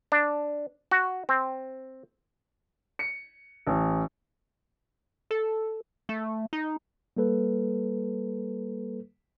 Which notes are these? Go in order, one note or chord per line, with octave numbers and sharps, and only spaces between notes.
D4
F#4
C4
C#7
A1
A4
A3
D#4
G3 A#3 A4 B4